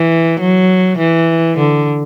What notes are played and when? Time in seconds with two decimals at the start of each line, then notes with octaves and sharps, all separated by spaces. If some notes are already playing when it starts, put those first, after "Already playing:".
Already playing: E3
0.41 F#3
0.98 E3
1.58 D3